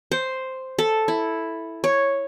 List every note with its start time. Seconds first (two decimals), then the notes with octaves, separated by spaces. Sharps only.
0.11 C5
0.79 A4
1.08 E4
1.84 C#5